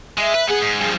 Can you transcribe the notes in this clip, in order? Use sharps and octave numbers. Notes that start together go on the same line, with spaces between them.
G#3 E5
B4
B3 G#4 F#5
G#2
G2 F3